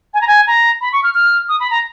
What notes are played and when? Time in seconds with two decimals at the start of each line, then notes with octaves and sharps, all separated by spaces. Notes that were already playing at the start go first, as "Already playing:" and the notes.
0.14 G#5
0.21 A#5
0.27 G#5
0.47 A#5
0.81 B5
0.93 C#6
1.04 F6
1.14 F6
1.49 D#6
1.60 B5
1.71 A#5